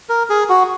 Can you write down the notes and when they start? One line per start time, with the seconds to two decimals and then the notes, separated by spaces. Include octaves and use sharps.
0.09 A#4
0.30 G#4
0.49 F#4